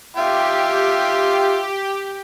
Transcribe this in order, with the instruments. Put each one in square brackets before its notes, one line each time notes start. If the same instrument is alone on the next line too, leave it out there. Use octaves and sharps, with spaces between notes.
[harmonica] F4 E5 G5 [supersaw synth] G4